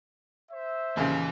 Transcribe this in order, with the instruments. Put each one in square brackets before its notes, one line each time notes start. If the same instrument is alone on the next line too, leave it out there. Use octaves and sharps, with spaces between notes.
[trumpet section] C5 E5
[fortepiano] D#2 A#2 C#3 [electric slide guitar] E3 G#5